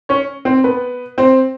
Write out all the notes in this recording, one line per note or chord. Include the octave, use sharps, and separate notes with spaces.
C#4 C#5
C4 C5
B3 B4
C4 C5